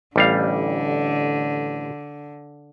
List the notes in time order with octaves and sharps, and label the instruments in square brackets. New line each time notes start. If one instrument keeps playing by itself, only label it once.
[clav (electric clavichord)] A1 G3 F5 [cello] D3